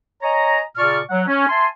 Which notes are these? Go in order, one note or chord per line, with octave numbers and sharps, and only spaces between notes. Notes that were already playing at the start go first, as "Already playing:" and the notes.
C#5 D#5 G#5 A#5
A#2 C#3 D5 A5 C#6 F6
F#3 F#5
C#4
E5 G#5 A5 C6